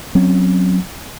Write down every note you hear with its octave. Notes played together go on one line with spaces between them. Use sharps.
F#3 C4 C#4